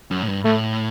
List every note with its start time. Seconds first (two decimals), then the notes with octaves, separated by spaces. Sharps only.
0.11 F#2
0.22 A2
0.28 G2
0.45 A2 A3